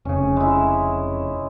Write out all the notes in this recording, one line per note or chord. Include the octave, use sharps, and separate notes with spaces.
F1 C#3 C#4
G#3 E4